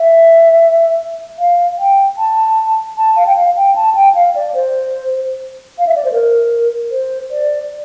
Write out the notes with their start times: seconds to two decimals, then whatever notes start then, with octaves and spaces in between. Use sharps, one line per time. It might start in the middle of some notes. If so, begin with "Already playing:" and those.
Already playing: E5
1.39 F5
1.78 G5
2.18 A5
2.97 A5
3.16 F5
3.26 G5
3.36 F5
3.56 G5
3.76 A5
3.95 G5
4.15 F5
4.35 D5
4.54 C5
5.78 F5
5.87 E5
5.96 D5
6.05 C5
6.12 A#4
6.91 C5
7.31 D5